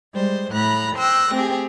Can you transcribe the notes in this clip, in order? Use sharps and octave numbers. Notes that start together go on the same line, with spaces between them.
G3 G#3 C5
A2 A#5 B5 F#6
C5 G5 E6 F#6 A#6
A3 C4 G4 G#4